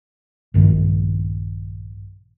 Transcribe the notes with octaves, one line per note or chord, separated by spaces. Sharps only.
A#1 G2 D#3 G#3